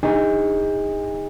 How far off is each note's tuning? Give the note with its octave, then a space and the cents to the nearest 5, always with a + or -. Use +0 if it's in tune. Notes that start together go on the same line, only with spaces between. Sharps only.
D#4 +15 G#4 -35